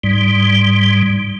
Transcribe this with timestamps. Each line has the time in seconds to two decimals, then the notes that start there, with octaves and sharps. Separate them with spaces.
0.03 G#2 G3